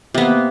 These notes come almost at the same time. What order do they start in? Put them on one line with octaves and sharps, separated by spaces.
C3 B3 A#3